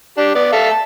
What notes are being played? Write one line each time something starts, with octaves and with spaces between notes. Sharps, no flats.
D4 G4
B3 D5
A4 E5 F5
A5